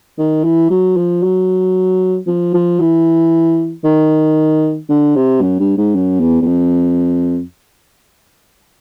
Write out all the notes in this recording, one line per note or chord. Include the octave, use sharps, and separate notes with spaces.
D#3
E3
F#3
F3
F#3
F3
F3
E3
D#3
D3
C3
F#2
G2
G#2
F#2
E2
E2
F2